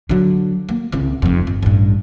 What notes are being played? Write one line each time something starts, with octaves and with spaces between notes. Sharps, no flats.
D3 F#3
A#3
C2 C#3
F1 F2
G1
A1 G2